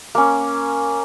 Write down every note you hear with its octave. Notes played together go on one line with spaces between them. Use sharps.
A#3 C#4